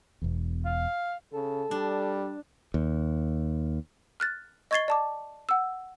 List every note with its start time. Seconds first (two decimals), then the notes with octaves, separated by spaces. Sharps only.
0.22 E1 E2
0.65 F5
1.33 C#3 A4
1.71 G3 D4
2.74 D#2
4.20 F6 F#6 A6
4.71 D#5 C#6 G#6 A6 C7 G7
4.88 D5 A5 D6
5.49 F#5 E6